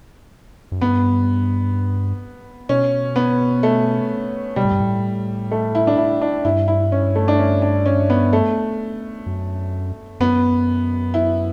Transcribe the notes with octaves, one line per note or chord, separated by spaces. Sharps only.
F#2
G2 B3
B2 C#4
B3
A3
B2 G3
A2
G2
A2
A3
E4
D4
E4
D4
G2 E4
E4
C#4
A3
D4
C#4
D4
C#4
B3
A3
F#2
F#2 B3
E4